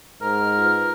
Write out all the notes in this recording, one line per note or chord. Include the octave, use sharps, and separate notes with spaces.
G#2 A#4 F6
F4 B4